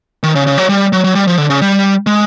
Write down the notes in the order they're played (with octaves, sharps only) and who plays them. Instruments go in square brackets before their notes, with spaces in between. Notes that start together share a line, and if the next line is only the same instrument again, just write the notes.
[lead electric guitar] D#3
C#3
C#3
F#3
G3
F#3
F#3
G3
F3
D3
C#3
G3
G#3